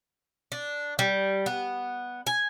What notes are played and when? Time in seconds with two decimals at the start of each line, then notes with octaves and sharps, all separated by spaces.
0.52 D4
0.99 G3
1.46 B3
2.27 G#5